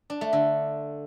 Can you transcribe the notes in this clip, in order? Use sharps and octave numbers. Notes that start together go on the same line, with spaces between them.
D4
A3
D3